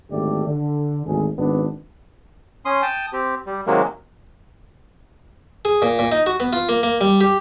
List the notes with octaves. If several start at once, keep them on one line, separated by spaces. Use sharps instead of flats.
G#1 D3 A3 G4 D5
D3
G#1 D2 G#4
G#1 B3 D4
C#4 C6 D#6
G5 A5 D#6
C4 G4
G3
C3 D#3 F#3 G#3 A#3
G#4
A#2
A#2
D#4
F#4
B3
F4
A#3
A#3
G3
G4